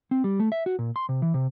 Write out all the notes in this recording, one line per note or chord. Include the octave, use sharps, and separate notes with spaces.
C4
G3
A3
E5
F#4
A#2
C6
C3
E3
C3